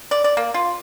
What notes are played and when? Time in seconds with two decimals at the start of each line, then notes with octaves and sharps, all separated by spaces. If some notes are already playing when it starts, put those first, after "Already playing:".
0.11 D5
0.24 D5
0.37 A#3
0.54 F4